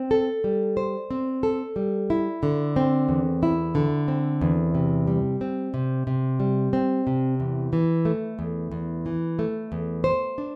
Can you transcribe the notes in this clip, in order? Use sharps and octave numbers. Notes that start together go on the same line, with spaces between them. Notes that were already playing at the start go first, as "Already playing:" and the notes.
Already playing: C4
A4
G3
C5
C4
A4
G3
E4
D3
C4
E2
E4
D3
C4
E2
C3
G3
C4
C3
C3
G3
C4
C3
E2
E3
A3
E2
E2
E3
A3
E2
C5
D4